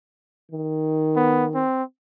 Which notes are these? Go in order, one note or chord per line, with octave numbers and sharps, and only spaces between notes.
D#3
B3
C4